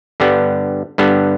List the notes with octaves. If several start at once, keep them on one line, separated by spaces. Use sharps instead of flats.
G2 D3 G3 B3
G2 D3 G3 B3